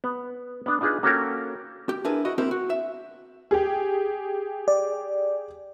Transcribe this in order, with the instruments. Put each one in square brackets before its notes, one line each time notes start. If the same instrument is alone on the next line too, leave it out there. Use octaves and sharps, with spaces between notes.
[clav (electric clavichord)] B3
B3 D4
D4 D#4 F4 G#4 B4
A#3 C#4 F#4 A4 F5 G5
[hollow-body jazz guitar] G4
D4 E4 G#4 A#4 B4
E4 F#4 D#5
A#3 C4 E4 G4 A#4 C5
F#4
E5
[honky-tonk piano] G4 G#4
[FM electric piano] D5